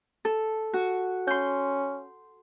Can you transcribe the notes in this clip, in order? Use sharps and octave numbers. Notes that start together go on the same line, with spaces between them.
A4
F#4
C#4 C6 G6